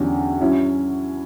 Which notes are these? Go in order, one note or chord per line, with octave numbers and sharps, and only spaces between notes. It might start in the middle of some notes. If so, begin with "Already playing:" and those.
Already playing: E2 D3 F#3 C#4 G4
F#3 C#4 E4